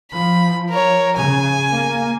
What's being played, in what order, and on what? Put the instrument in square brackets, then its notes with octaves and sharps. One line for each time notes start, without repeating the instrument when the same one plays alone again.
[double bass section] F3 [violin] B5
[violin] A#4 C#5
[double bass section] C#3 [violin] G#5
[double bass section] A#3